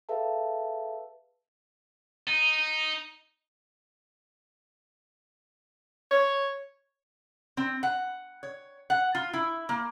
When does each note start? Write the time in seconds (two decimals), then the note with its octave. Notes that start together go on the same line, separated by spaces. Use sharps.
0.09 G#4 A4 B4 E5 F5 A5
2.28 D#4
6.11 C#5
7.57 C4
7.83 F#5
8.43 C#5
8.90 F#5
9.15 F4
9.33 E4
9.69 A#3